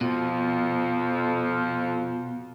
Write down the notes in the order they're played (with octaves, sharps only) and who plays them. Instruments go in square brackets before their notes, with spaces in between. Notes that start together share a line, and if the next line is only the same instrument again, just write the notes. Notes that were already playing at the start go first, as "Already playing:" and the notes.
[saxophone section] F2 F3 [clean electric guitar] B2